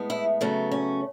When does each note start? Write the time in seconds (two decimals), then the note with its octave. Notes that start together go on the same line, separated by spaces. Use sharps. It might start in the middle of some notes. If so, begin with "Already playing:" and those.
Already playing: A2 G#3 B3
0.10 E4
0.41 C#3 F#3 A3 B3
0.72 C#4